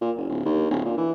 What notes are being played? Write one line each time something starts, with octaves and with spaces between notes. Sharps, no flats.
A#2
F#1
D1
D#2
D1
A#2
E3